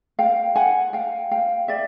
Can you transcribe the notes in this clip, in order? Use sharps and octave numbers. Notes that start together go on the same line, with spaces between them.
F5 G5
F#5 G#5
F5 G5
F5 G5
D5 E5